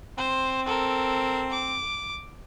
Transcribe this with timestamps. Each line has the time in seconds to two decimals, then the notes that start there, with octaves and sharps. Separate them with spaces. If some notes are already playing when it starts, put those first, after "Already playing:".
0.18 C4 C5
0.66 A4 A#4
1.51 D6